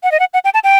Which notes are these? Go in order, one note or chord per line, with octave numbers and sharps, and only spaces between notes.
F#5
D#5
F#5
F#5
G5
A5
G5